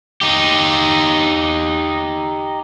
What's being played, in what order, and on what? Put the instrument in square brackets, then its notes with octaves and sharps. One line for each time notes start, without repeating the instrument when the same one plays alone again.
[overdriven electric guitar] D#4 G4